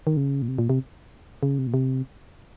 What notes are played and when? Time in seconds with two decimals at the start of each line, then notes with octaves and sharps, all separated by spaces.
0.07 D#3
0.17 C#3
0.42 A#2
0.48 C3
0.58 A#2
0.70 C3
1.43 C#3
1.58 C3
1.67 A#2
1.74 C3